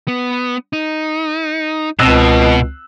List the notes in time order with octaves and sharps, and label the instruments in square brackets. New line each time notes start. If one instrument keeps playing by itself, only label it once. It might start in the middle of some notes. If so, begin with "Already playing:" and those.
[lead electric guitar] B3
D#4
[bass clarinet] C#2 [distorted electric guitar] B2 [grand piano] C4 E6 F#6 [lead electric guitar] D#5 A5